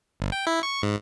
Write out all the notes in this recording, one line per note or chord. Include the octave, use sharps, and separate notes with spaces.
G1
G5
E4
C#6
G#2